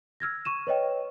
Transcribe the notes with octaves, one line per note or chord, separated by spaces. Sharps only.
E6 F6 G#6 A#6
C#6 D#7 E7
B4 C#5 D#5 G5